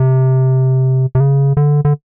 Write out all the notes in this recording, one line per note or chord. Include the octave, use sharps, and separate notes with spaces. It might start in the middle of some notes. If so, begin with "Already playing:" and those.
Already playing: C3
C3
C#3
D3
D3